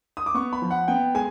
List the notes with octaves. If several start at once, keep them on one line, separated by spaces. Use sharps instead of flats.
D#6
D6
B3 C#6
B5
F3
F#5
B3 G5
G#3 G#5